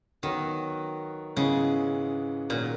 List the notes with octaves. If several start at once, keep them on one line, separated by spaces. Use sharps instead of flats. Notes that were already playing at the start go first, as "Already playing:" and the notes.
D#3 F#3 B3 F#4 A#4
G#2 C#3 E3 G#3 B3
A#2 D#3 F#3 B3